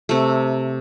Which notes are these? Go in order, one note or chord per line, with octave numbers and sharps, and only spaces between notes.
C3 A3